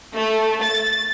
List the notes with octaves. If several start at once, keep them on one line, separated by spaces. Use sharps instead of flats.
A3
A6